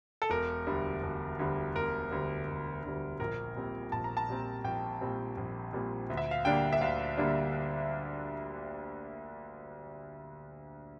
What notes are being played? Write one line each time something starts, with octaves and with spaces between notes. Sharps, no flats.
A4
E1 A#4
D2 D3 G3
E1
D2 D3 G3
E1 A#4
D2 D3 G3
E1
D2 D3 G3
A#1 A#4
A#2 G3 C4
A#1 A5
A#5
A5
A#2 G3 C4
A#1 G5
A#2 G3 C4
A#1
A#2 G3 C4
D2
E5
F5
D3 G3 A#3 D4 G5
E5
D2 F5
D3 G3 A#3 D4